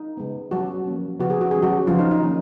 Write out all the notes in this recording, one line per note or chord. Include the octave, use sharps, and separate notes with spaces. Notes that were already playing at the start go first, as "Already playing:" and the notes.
Already playing: D#4
C#3 G#3 B3
F#3 C#4 F#4
F3 A#3 C#4
C#3 F3 B3 F#4
G#4
F#4
D#3 G#3 C#4 G#4
F#3 F#4
C#3 F3 F#3 C#4 F4
D#4
D#4
D#3 F#3 A#3 C#4